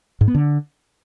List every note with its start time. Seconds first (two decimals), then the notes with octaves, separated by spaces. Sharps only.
0.21 G#2
0.28 B3
0.35 D3